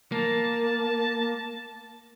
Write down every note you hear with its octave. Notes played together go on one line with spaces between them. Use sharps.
A#3 A5